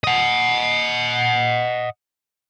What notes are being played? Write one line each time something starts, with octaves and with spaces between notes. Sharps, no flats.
D#5 F#5